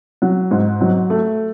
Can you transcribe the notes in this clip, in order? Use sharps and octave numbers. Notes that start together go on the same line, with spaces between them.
F#3
G#2
F#3
A3